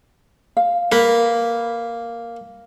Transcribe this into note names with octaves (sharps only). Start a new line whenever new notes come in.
F5
A#3 B4